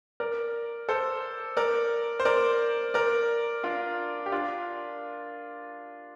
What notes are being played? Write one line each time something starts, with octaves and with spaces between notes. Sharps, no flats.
A#4 D5
A4 C5
A#4 D5
C5
A#4 D5
A#4 D5
D4 F4
G4
D4 F4